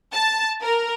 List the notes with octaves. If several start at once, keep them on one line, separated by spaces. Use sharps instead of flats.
A5
A#4